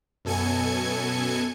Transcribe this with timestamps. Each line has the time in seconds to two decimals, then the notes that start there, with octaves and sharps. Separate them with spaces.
0.25 F#2 B2 A4 G#5 G#6 C#7